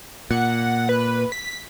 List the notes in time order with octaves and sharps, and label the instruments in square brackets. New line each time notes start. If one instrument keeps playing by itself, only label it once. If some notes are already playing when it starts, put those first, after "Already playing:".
[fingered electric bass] A#2 [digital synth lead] F#5
[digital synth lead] B4
B6